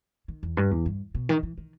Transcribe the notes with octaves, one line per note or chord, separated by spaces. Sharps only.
D#3
E2
G2
E2
G2
B2
D#3
E3
D#3